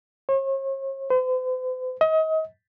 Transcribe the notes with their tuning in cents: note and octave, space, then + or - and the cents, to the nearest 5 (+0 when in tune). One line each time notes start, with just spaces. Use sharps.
C#5 -45
C5 -45
D#5 +35